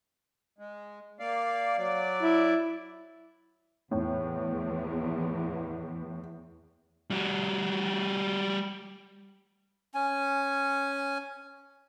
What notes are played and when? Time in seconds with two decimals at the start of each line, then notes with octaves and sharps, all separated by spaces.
0.58 G#3
1.19 A#3 D5 F5
1.78 F#3 D5
2.22 E4
3.91 E2 A2
7.11 G3 F#4
9.94 C#4 G#5